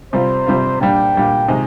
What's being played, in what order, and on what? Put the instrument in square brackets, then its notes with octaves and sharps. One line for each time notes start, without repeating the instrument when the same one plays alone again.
[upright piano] C3 G3 C4 F4 [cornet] C5
[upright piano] C3 G3 C4 F4
[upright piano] A#2 G3 D4 [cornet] G5
[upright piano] A#2 G3 D4
C3 D#3 G#3 D#4